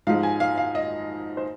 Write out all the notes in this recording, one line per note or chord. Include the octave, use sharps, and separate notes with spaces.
G#2 F3 G#3 F5
G#5
F5
F5
D#5
C5